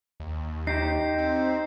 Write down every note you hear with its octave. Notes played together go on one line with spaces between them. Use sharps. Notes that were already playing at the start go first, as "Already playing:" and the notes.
D#2
D#4 G4 C5 G6 C7
C4